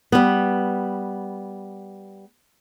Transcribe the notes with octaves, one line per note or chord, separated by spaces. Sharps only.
G3 B3